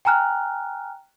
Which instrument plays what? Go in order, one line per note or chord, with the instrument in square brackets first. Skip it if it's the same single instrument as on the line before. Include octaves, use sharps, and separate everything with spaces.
[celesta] G5 G#5 A#5 F6 F#6